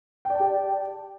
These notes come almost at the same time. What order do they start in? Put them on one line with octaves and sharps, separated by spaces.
G5 D5 A5 G4